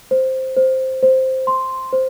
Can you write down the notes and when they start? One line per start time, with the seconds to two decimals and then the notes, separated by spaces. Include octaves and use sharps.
0.11 C5
0.57 C5
1.03 C5
1.47 C6
1.93 C5